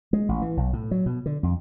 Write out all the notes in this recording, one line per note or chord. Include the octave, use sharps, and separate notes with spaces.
G#3
A1
E3
B1
A2
F#3
B2
D3
F2